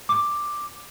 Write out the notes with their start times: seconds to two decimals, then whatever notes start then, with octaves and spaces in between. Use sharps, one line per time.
0.09 D6